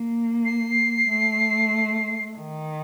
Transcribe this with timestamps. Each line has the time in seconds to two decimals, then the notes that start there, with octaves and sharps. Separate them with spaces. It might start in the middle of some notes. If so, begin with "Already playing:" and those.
Already playing: A#3
0.45 C7
1.08 A3
2.36 D#3